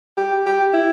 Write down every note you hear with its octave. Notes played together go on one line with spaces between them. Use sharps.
G4
G4
E4